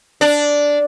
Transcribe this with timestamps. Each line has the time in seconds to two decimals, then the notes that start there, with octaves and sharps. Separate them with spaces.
0.21 D4